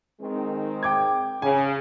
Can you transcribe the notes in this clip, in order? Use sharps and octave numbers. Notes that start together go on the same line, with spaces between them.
D#3 G#3 C4
G5 D6 G#6
C#3 G#5